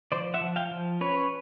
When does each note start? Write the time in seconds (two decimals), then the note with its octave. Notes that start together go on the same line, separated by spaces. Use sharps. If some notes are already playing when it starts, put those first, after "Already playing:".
0.12 F3 C5 D5
0.34 E5 F#5
0.41 F3
0.56 F5 G5
0.71 F3
1.01 C#4 B4 C#5